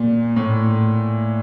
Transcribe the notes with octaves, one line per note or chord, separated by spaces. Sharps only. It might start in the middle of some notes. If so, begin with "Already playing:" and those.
Already playing: A#2
A2